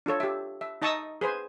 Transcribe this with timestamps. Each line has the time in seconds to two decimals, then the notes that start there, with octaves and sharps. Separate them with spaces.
0.06 D4 F4 A4 C#5
0.20 G4 E5
0.61 E5
0.82 D#4 D#5 A5 C#6 D#6 E6
1.21 G#4 B4 C5 G#5